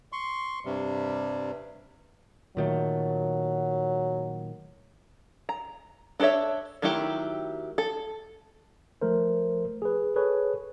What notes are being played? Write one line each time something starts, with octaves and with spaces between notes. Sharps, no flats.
C6 C#6
G2 C3 G3
A#2 D#3 F#3 A3
A#5
D4 A4 C5 C#5 E5
D#3 F#3 A3 E4 G4
A4
F3 A3 A#4 C5
G#4 B4
G#4 A4 B4 C#5